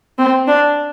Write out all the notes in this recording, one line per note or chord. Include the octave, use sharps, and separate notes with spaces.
C4
D4